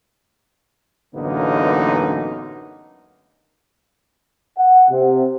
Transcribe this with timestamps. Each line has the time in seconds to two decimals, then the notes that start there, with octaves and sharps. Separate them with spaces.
1.15 A1 F#2 D3 A#3 B3 D#4
4.58 F#5
4.89 C3